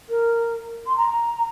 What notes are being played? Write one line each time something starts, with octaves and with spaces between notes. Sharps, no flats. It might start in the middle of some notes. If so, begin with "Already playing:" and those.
A#4
C6
A#5